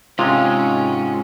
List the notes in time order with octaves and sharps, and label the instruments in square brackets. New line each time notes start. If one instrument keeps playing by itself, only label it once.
[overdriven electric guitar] G#2 [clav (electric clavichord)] C3 G#3 [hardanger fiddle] C#4 [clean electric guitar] F4